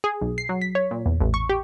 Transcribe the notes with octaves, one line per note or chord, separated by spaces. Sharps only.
G#4
B1
C7
F#3
B6
C#5
A#2
E2
A1
C#6
G4